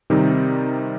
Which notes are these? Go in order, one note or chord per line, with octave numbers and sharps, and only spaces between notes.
C3 D#3 G3 C4 D#4